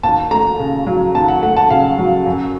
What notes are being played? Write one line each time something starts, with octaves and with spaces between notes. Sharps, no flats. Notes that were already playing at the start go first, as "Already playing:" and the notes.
D#2 A5
A3 A#5
C#3
F#3
D#2 A5
F#5
A3 F#5
A5
C#3 F5
F#3
F#2